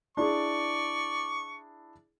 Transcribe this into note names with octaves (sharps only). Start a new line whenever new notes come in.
D4 E4 G#4 D5 C#6